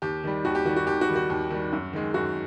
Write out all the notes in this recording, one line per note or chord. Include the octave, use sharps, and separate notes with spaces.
D#2 G4
D#3 G3
D#2 F#4
G4
D#3 G3 F#4
F#4
D#2 G4
F#4
D#3 G3
F#4
D#2
D#3 G3
F#2
D#3 G#3
F#2 F#4